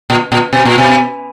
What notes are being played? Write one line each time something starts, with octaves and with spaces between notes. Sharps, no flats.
A#2
A#2
B2
A#2
B2